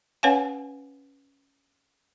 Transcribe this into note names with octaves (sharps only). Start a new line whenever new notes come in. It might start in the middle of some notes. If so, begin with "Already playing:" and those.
C#4 B4 C#5 F5 F#5 G#5